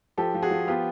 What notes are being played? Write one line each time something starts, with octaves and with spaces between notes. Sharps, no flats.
F3 G4 A4
F3
F#4 G#4
F3
B3 F4 G4